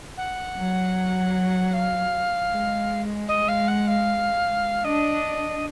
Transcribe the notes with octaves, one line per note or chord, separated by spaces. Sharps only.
F#5
F#3
F5
G#3
D#5
F5
F#5
F5
D4 D#5